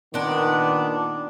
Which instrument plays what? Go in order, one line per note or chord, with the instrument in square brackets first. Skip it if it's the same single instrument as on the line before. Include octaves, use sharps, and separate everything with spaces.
[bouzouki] A#2 D4 [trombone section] D#3 B3